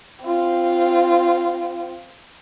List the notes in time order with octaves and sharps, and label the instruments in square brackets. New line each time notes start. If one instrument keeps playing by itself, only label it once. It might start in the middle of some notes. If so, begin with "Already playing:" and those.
[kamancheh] C4 F4